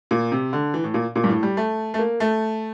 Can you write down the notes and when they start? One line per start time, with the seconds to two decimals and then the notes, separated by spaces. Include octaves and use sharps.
0.11 A#2
0.32 C3
0.53 D3
0.74 E3
0.84 A2
0.94 A#2
1.16 A#2
1.24 G2
1.29 A2
1.43 G3
1.57 A3
1.94 A3
1.99 A#3
2.20 A3